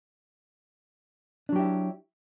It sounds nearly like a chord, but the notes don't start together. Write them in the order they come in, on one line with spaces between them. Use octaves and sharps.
D4 F#3 G4 E4